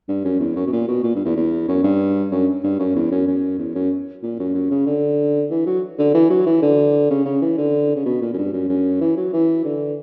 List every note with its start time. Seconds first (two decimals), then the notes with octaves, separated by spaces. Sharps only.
0.08 G2
0.24 F#2
0.40 E2
0.56 F#2
0.67 B2
0.72 A#2
0.88 B2
1.03 A#2
1.15 G2
1.25 E2
1.36 E2
1.68 F#2
1.83 G2
2.31 F#2
2.64 G2
2.79 F#2
2.95 E2
3.11 F#2
3.27 F#2
3.59 E2
3.75 F#2
4.23 A#2
4.39 F#2
4.55 F#2
4.71 C#3
4.86 D3
5.50 E3
5.66 F#3
5.99 D3
6.14 E3
6.30 F#3
6.46 E3
6.62 D3
7.10 C#3
7.25 C#3
7.42 E3
7.58 D3
7.96 C#3
8.05 B2
8.21 A#2
8.33 F#2
8.38 G2
8.53 F#2
8.69 F#2
9.01 E3
9.17 F#3
9.33 E3
9.65 D3